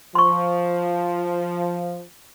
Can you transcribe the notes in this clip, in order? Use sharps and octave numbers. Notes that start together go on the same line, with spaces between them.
F3 C6 C#6